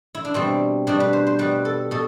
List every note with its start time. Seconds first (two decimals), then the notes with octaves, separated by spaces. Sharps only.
0.15 E4
0.25 D4
0.34 B2 G3 C4
0.87 B2 G3 D4
1.00 B4
1.13 C5
1.27 C5
1.39 B2 G3 B4
1.65 A4
1.91 B2 A4